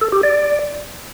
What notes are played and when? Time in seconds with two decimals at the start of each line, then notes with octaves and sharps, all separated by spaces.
0.01 A4
0.12 G4
0.23 D5